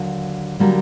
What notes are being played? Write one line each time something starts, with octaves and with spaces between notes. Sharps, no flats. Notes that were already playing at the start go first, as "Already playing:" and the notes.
Already playing: D#2 D3 F#3
D3 F#3 G3 A#3